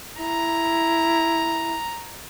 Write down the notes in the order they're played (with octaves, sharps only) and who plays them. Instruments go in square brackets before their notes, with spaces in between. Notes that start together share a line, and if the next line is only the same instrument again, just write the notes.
[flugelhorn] E4 [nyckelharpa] A#5